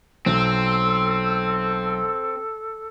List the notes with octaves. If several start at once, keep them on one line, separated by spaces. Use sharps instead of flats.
B1 C4 A4